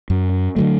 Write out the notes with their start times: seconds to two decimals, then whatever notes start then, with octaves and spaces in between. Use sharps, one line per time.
0.10 F#2
0.56 D3 F#3 A3